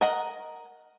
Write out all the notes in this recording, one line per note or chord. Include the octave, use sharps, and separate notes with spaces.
A#4 D#5 F#5 A#5